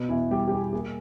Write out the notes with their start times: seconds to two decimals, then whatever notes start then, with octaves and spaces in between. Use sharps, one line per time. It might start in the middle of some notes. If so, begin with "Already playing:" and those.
Already playing: B2 B3
0.09 E2 E4
0.31 G3 G4
0.48 G4
0.51 B2 G#4
0.73 A#3 G#4